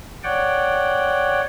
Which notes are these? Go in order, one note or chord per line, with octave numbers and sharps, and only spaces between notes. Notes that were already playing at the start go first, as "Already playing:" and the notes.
C#5 D5 F#5 G5